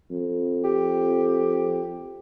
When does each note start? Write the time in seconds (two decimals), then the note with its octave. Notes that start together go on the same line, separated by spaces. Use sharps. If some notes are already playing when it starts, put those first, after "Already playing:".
0.11 F2
0.64 G4